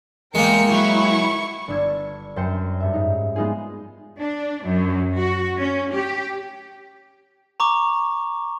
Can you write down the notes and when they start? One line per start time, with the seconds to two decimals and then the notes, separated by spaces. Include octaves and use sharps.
0.35 E2 G#3 A#3 A#4 G5 C#7
0.71 F#3 E4 C#6
1.68 G1 D4 E6 G#6
2.36 F#2 C5 G5 C#7 E7
2.80 G2 E5
2.93 G#2 D#4
3.36 G#3 B3 D#4 F4 G#4
4.19 D4
4.64 F#2
5.18 F#4
5.59 C#4
5.93 G4
7.60 A#5 C#6 D6